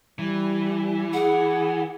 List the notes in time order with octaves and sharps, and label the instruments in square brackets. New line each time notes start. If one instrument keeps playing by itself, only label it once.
[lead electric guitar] E3 [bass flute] G3
[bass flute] G#4 [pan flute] F#5